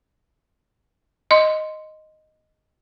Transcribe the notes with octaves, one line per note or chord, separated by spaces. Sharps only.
D#5 C6